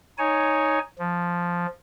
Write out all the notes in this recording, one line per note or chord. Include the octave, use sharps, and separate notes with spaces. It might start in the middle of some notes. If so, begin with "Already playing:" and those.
D#4 C#5 G#5
F3